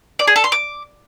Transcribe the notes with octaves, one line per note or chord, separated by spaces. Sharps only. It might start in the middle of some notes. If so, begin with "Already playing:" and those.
D5
G#4
A4
C6
D6